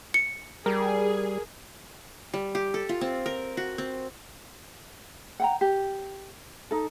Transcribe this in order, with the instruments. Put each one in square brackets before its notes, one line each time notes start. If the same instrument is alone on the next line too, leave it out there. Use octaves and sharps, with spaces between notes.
[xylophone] C#7
[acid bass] G3 [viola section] G#4 [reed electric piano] A#4
[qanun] G3
G4
A4
F4
C4
A#4
F#4
C4
[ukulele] F#5 G5 A#5
G4
D#4 A4